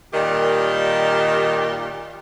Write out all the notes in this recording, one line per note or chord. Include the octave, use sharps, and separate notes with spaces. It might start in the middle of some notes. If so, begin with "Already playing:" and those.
A#2 D#3 G3 G4